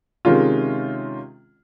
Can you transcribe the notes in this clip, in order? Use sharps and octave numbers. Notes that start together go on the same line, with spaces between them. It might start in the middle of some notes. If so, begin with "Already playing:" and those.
C3 D#3 G#3 C#4 F4